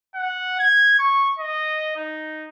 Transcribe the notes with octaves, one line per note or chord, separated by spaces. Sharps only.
F#5
G#6
C#6
D#5
D#4